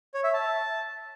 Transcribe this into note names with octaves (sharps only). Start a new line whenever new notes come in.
C#5
E5
A5